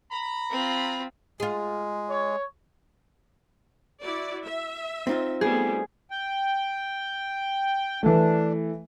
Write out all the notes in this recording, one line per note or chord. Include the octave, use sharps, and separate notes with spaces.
A#5 B5
C4 F4
G#3 F4 G#4
C#5
E4 F#4 D5
E5
C4 D#4 F4
G3 A3 B3 G#4
G5
E3 A3 D4